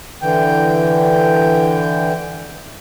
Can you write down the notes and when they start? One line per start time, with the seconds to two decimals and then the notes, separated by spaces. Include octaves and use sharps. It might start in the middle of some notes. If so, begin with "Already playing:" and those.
0.22 D3 E3 G5